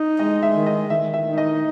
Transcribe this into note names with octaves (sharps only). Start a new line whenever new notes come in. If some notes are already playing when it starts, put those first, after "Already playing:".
Already playing: D#4
G#3 D#5
E5
D#3
D#5
D#3 E5
E5
D#4
D#5